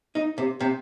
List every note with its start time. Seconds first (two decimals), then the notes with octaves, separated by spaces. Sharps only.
0.15 D#4
0.38 C3
0.60 C3